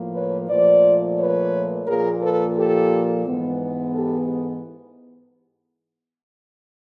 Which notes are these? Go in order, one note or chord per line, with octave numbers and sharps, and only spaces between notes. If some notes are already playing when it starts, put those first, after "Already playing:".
Already playing: A2 F3 A#3
B4 C#5
A#2 F3 A3 C5 D5
B4 C#5
A#2 F3 A#3 G#4 A#4
A4 B4
G4 A4
G#2 E3 G#3 B3
G4 A4